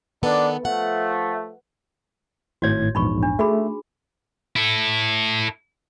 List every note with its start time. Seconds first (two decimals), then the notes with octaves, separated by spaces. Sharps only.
0.23 D#3 B3 D4 A4
0.65 F3 A3 F#5
2.62 G#1 A2 F#4 C#5 G#6
2.95 A#1 E2 G#2 D#4 B5 C#6
3.23 D4
3.39 A3 F#4 G#4 B5
4.56 E4 A4